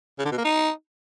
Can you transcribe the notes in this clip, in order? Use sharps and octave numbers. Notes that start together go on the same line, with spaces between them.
C#3
D3
B2
A#3
D#4